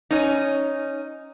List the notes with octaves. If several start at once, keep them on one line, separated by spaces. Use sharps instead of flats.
C#4 D#4